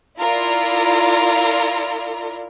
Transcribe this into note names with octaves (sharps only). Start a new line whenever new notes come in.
E4 F4 A#4 D5